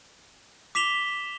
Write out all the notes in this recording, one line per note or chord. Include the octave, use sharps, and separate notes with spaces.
D6 B6 E7 F7 G7